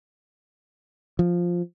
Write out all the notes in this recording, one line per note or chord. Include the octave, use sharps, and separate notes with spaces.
F3